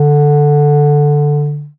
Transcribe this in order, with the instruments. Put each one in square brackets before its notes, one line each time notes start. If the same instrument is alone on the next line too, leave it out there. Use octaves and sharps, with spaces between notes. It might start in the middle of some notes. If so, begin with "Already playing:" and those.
Already playing: [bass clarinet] D3